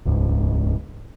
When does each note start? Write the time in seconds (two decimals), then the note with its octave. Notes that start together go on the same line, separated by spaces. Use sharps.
0.05 D#1 C#2 G#2